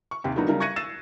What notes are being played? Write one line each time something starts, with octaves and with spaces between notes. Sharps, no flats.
C#6
D#2 C3 G4
D3 F#3 A#3 B3 D#4 F#4
C#3 F#3 G3 D#4 A#4
C#6 F#6 G#6 A#6 C#7 D#7
E6 A6 C7 E7